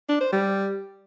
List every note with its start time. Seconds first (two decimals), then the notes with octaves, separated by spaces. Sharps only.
0.09 D4
0.21 C5
0.32 G3